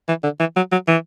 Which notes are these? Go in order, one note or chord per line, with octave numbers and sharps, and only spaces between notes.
E3
D3
E3
F#3
F#3
E3